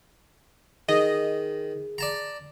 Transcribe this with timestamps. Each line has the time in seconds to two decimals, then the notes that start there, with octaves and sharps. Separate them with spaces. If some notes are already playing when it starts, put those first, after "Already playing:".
0.89 D#3 G#4 D#5
1.98 D5 A5 A#5